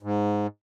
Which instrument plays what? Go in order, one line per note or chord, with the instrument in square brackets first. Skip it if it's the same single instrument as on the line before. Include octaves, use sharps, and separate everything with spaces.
[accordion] G#2